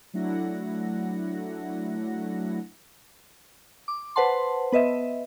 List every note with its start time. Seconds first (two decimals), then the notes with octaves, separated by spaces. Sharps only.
0.14 F#3 A3 D4 E4 F#5 A#6
3.88 D6
4.16 B4 C5 F#5 A5 C6
4.72 B3 B4 D#5 E5